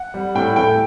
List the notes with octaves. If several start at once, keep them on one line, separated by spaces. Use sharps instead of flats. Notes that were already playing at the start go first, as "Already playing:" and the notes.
Already playing: F#5
G3
A2 G5
A3 G5